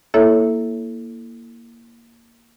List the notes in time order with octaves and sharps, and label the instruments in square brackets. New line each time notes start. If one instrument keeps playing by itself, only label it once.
[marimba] A#3 E4 A4 C#5 E5